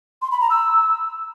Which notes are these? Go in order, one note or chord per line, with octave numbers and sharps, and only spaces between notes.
C6
B5
A#5
E6